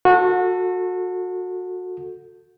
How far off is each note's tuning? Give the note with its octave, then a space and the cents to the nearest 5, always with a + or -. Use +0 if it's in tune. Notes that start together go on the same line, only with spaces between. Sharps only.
F#4 -25 A4 +15